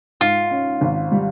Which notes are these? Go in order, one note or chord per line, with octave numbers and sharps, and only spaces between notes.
G#2 F4
C#4
G#1
G3